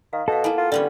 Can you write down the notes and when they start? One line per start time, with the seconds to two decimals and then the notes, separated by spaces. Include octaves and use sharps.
0.13 D#3 F5
0.28 B2 A4 E5 F5
0.44 A#3 B3 E4 F5 G#5
0.58 F4
0.72 D3 G3 B3 C#4